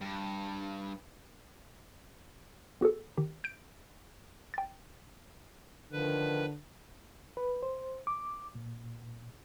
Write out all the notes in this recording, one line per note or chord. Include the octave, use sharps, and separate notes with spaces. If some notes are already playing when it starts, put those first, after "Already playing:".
G2
B3 F#4 G#4 A4
D#3 G4
G6 D7
G5 A6
D3 D#3 F3 B4
B4
C5
D6
A#2